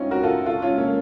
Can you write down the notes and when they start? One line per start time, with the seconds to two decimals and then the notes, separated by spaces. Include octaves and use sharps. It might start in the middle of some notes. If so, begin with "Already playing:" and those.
Already playing: C4 C#4 D#4 F4
0.11 F#4 A#4
0.23 F4 A4
0.46 F4 A4
0.62 C#4 F4
0.78 A#3 C#4